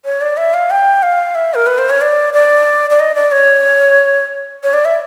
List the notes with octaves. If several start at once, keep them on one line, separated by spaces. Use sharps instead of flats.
C#5
D5
E5
F5
G5
F5
E5
A#4
B4
C5
C#5
D5
D5
D5
D#5
D5
C#5
C#5
D5
E5